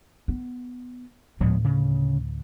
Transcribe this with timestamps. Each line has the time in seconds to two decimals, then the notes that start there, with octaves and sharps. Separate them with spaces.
0.28 B3
1.40 D2 A2 F3 G#3 B3
1.64 C#3